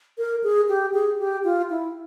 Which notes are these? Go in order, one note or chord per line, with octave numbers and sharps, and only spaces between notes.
A#4
G#4
G4
G#4
G4
F4
E4